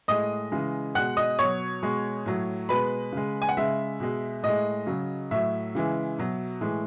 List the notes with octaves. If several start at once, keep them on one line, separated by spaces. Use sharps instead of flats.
A2 G#3 D#5 D#6
C#3 E3 G#3
B2 G#3 F#5 F#6
D#5 D#6
B2 F#3 C#5 C#6
B2 G#3
A2 F#3
B2 G#3 B4 B5
C#3 G#3
G#5
F#5
C#3 G#3 E5
B2 G#3
A2 G#3 D#5
C#3 F#3
A2 F#3 E5
C#3 E3 G#3
B2 F#3
A2 E3 G#3